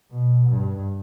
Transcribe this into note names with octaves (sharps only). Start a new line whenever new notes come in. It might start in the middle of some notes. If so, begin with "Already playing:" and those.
B2
G2